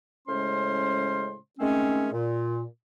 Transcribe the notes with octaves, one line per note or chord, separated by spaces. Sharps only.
A2 C#3 G#3 C#4 C5 C6
D#3 G#3 A3 C4 C#4
A#2